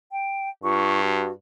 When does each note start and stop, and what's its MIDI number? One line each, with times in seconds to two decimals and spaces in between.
0.11 0.49 79
0.64 1.31 43
0.64 1.01 65
0.64 1.01 85
1.03 1.32 66